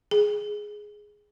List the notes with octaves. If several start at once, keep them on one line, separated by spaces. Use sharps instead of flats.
G#4